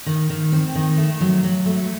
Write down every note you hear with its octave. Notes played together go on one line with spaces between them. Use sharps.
D#3
D#3
C4
D#3
A3
F#3
F#3
A3